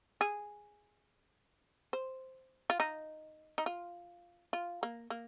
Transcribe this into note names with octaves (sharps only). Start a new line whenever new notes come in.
G#4
C5
F4
D#4
D#4
F4
F4
A#3
A#3